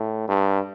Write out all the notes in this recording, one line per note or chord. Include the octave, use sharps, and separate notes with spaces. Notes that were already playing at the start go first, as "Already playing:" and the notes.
Already playing: A2
G2